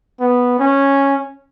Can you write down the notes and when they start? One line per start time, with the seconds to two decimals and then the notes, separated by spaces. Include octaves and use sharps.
0.21 B3
0.59 C#4